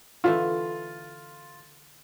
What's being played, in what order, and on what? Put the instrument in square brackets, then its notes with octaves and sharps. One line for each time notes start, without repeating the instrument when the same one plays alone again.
[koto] D3 E3 A3 [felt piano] F4